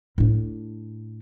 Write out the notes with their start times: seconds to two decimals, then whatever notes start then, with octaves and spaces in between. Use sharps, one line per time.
0.18 A2 D4